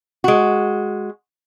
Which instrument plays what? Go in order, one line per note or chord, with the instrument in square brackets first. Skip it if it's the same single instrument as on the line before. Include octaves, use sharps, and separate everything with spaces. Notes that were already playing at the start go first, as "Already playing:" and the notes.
[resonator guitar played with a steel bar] G#3 F#4